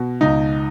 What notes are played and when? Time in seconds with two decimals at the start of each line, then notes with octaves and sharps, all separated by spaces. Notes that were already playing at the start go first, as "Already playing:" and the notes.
Already playing: B2
0.21 C#2 D#4